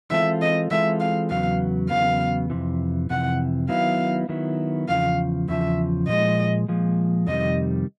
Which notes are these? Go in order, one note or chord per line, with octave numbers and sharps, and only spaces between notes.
E3 G#3 C4 F4 A4 E5
D#5
E3 G#3 C4 F4 A4 E5
F5
E2 C#3 F#3 B3 F5
E2 C#3 F#3 B3 F5
F2 C3 E3
F2 C3 E3 F#5
D#3 F#3 B3 E4 F5
D#3 F#3 B3 E4
E2 C#3 F3 F5
E2 C#3 F3 E5
A#2 F3 G#3 D#5
A#2 F3 G#3
F2 C3 D#3 G3 D#5